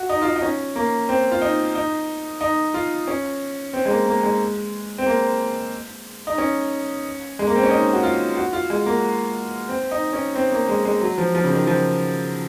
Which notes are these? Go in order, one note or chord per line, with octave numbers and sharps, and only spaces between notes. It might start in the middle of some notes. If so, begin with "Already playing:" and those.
Already playing: F#4
D#4
F4
D#4
D#4
C#4
A#3
C4
F4
D#4
D#4
D#4
F4
C#4
C4
G#3
A#3
A#3
G#3
C4
A#3
D#4
C#4
G#3
A#3
C4
C#4
D#4
F#4
F4
F#4
F4
G#3
A#3
C4
D#4
C#4
C4
A#3
G#3
G#3
F#3
F3
F3
C#3
D#3
F3